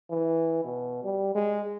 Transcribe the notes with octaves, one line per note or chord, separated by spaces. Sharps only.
E3
B2
G3
G#3